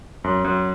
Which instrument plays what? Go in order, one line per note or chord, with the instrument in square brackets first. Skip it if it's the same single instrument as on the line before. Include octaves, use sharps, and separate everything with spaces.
[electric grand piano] F#2
F#2